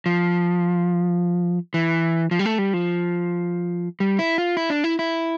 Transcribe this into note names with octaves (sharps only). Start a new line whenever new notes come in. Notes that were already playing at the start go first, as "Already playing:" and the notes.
F3
E3
F3
G3
A3
G3
F3
G3
E4
F4
E4
D4
E4
E4